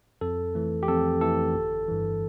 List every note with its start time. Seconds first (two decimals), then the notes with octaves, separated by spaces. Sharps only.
0.21 F2 A4
0.55 E3 A3
0.83 G4
0.88 F2 A4
1.21 E3 A3 A4
1.54 G1
1.88 G2 E3